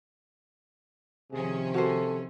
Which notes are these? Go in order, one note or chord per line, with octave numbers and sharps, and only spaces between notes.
C3 D#3 F3 C#4 G#4
F#4 A4 A#4 C5